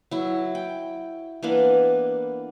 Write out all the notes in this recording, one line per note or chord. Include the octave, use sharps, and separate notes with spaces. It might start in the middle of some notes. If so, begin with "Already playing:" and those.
F#3 E4
G5
E3 A#3 B3 D4